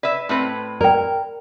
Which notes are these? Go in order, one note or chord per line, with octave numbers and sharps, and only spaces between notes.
B4 D5 E5
A2 C4 B4
A#4 D5 G5